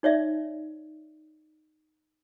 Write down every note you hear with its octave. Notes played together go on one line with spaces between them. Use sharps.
D#4 C#5 D5 E5